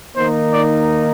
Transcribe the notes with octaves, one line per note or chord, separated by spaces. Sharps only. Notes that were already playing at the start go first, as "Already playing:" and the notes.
D#3 A#3 D#4 C5
D5